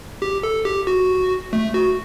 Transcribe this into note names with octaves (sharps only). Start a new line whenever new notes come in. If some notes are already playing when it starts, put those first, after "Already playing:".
G4
A4
G4
F#4
A3
F#4